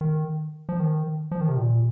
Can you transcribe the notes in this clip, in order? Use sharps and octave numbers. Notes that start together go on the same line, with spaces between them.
D#3
F3
D#3
F3
D#3
C3
A#2